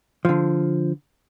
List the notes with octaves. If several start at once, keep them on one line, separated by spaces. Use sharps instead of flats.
D3 F3